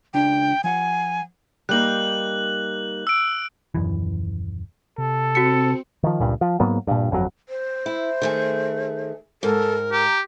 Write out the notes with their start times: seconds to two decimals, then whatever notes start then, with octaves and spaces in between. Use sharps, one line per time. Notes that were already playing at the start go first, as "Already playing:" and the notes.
0.14 C#2 D4 G5
0.64 F3 F#5 G#5
1.69 G3 A#3 D#4 F#6 F#7
3.07 E6 D7
3.75 D#1 C2 F#2 E3
4.98 C3 A4
5.35 C4 F#4 C#7
6.03 D#3 F3
6.20 C#2 G2 A#2
6.41 F3
6.60 G#2 F#3 A#3 B3
6.87 G2 A#2
7.11 G1 F2 C3 F#3
7.49 C5
7.86 E4
8.22 D#3 A3 G#4
9.43 G#2 A4 A#4
9.92 G4 A#5